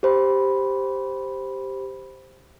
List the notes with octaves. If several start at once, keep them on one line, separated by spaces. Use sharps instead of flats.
G4 C5 B5